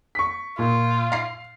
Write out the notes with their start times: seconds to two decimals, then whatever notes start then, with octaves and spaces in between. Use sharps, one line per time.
0.15 C#6 B6
0.59 A#2 F4
1.12 F5 C7